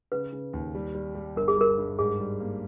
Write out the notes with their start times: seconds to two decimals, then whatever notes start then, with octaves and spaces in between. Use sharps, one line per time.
0.12 C#3 B4
0.32 C#3
0.53 D#2
0.75 G3
0.95 G3
1.15 G3
1.36 G1 A#4
1.48 G#4
1.57 G2 A#4
1.78 G2
1.99 G#2 G#4
2.20 G3
2.40 A#3